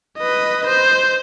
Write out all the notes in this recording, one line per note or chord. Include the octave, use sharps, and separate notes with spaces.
B4 D#5
C5